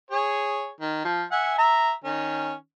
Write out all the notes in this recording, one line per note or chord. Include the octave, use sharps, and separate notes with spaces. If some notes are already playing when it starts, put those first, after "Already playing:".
G#4 C#5
D#3
F3
E5 F#5 G#5
E5 A#5
D#3 C#4